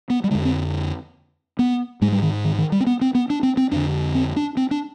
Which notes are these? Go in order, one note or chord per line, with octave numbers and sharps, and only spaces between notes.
B3
G3
F2 D3 G#3
C4
B3
G#2 G#3
G3
D#3
D#3
D#3
G3
C4
B3
C4
B3
D4
C4
C4
F2 D3 D4
C4
D4
C4
D4